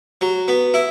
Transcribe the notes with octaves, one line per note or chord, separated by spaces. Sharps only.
F#3
B3
E4